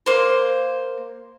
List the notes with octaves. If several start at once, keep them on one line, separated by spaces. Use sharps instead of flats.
A#3 C5